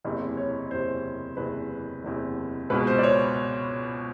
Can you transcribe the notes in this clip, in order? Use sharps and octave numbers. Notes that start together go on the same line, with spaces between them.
F#1 E2 C3
C#5
F#1 E2 C3 C5
F#1 E2 C3 B4
F#1 E2 C3
C#2 B2 G#3 B4
C5
D5
C#5